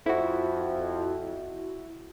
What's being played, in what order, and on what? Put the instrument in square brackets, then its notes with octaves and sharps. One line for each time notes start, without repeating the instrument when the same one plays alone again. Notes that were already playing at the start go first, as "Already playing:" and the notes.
[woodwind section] F2 [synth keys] E4 F#4